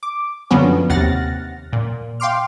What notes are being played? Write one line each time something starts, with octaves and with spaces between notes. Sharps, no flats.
D6
F#2 D3 F3 F#3 B3 C#4
D#2 C3 F#5 F6 A6 A#6
A#2
F5 G5 C6 D6 F6